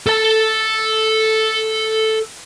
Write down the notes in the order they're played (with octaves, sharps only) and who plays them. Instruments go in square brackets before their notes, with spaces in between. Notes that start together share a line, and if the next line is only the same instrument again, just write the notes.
[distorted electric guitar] A4 A5